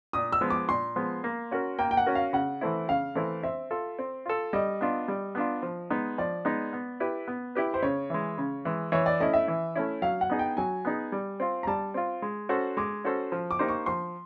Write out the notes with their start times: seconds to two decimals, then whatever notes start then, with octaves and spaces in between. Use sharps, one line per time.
0.13 A#2 D#6
0.32 E6
0.41 F3 G#3 B3
0.50 D6
0.69 A#2 C6
0.96 F3 G#3 B3
1.24 A#3
1.51 C#4 F#4 A#4
1.79 A#3 G5
1.91 G5
1.97 F#5
2.06 C#4 F#4 A#4
2.15 F5
2.33 C#3 F#5
2.61 E3 A3 C4 E4
2.88 C#3 F5
3.15 E3 A3 C4 E4
3.43 C4 E5
3.71 F4 A4
3.99 C4
4.26 F4 A4
4.53 G3 D#5
4.81 B3 D4 F4
5.08 G3
5.35 B3 D4 F4
5.63 F3
5.90 G#3 B3 D#4
6.18 F3 D5
6.45 G#3 B3 D#4
6.73 B3
7.00 E4 G4 B4
7.28 B3
7.55 E4 G4 B4
7.74 C5
7.82 C#3 C#5
8.10 E3 G#3
8.38 C#3
8.65 E3 G#3
8.92 E3 C#5
9.06 D5
9.20 A3 C#4 E4 D#5
9.33 E5
9.48 E3
9.76 A3 C#4 E4
10.02 F#3 F5
10.21 F#5
10.30 B3 D#4 G#4
10.39 G5
10.57 F#3 G#5
10.85 B3 D#4 G#4
11.12 G3
11.40 C4 F4
11.63 A#5
11.67 G3 A5
11.94 C4 F4
12.22 G#3
12.49 C#4 F#4 A4 C5
12.77 G#3 D6
13.04 C#4 F#4 A4 C5
13.32 F3
13.51 D6
13.59 A#3 D#4 G4 C5
13.68 C#6
13.86 F3 C6